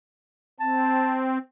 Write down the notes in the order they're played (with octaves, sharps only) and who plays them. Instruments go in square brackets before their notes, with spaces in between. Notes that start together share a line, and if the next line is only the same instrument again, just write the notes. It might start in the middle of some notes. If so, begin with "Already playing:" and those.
[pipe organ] C4 [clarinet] A5